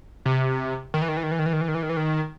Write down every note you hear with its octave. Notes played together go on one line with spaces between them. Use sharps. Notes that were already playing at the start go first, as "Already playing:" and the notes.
C3
D#3
E3
D#3
E3
D#3
E3
D#3
E3
D#3
E3
D#3
E3
D#3
E3
D#3